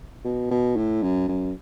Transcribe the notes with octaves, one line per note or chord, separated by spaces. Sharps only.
B2
B2
A2
F#2
F#2